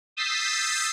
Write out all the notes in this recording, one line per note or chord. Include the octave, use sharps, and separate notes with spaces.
D#6 E6 G6 A6 B6 C7